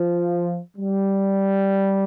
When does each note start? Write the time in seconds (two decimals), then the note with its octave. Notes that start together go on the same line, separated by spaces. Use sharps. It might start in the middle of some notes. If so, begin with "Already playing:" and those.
Already playing: F3
0.77 G3